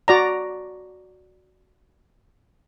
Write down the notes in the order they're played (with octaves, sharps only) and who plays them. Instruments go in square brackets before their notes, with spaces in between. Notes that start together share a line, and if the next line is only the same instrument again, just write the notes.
[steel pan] F#4 D5 A#5